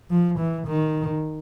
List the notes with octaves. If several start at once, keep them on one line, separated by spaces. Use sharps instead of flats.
F3
E3
D#3